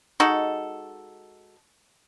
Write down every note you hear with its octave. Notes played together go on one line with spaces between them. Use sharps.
G#3 D#4 F#4 A4